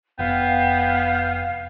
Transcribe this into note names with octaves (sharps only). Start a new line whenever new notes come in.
F1 B3 F5 G5